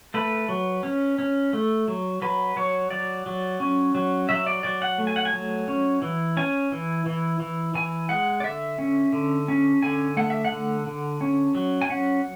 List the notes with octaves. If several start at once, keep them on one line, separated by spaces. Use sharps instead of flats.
A3 B4
F#3
C#4
C#4
A3
F#3
F#3 B4
F#3 C#5
F#3 D5
F#3
C#4
F#3
F#3 E5
D5
F#3 D5
F#5
A3
G#5
F#5
G#5
F#3
C#4
E3
C#4 G#5
E3
E3
E3
E3 G#5
G#3 F#5
D5
D3 E5
C#4
D3
C#4
D3 G#5
A3 F#5
E5
F#5
D3
D3
C#4
F#3
G#5
C#4 F#5